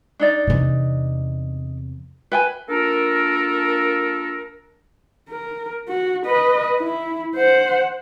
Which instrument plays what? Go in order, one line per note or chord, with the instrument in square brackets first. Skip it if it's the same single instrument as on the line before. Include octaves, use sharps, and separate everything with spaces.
[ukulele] D4 D#4 D5
[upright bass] E2 C3
[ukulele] B4 G5 G#5
[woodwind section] A#3 D4 F4 A4 A#4
[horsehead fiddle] A#4
F#4
B4 D#5
E4
C5 F#5